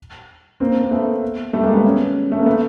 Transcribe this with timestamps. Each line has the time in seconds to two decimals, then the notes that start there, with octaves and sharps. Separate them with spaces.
0.60 A#3 C4
0.82 A#3
0.91 A3 B3
1.53 G3 A3
1.63 G#3 A#3
1.74 A3 B3
1.84 B3 C#4
2.32 A3
2.39 A#3
2.46 A3 B3